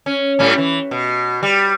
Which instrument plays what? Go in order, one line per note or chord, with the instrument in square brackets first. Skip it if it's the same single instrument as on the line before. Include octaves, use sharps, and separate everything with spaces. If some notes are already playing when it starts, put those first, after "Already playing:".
[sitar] C#4
A2 G3 C#4
E3
B2
G3